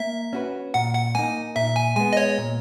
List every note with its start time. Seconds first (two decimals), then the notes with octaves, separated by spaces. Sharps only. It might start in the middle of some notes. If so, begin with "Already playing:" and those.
Already playing: A#3 E5
0.33 C#4 F#4 B4
0.74 A#2 F#5
0.95 F#5
1.15 A#3 D#4 G#5
1.56 A#2 E5
1.76 G#5
1.96 G#3 B3 G#5
2.13 D#5
2.17 C#5
2.38 A#2